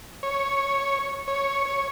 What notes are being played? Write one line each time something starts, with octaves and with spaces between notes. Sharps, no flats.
C#5
C#5
C#5